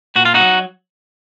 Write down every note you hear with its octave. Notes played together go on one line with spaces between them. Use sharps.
A#2 F#4
F4
D#4 F#4
F#3